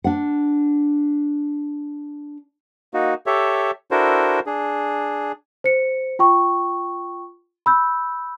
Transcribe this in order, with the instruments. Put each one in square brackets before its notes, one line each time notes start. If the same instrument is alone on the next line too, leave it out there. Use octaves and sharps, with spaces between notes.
[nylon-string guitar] D4 F#5
[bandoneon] A#3 D#4 F#4
G4 A4 C#5 E5
D4 E4 F#4 A4 A#4 C5
D4 G#4
[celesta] C5 C#7
F4 G5 C#6
B5 E6 G6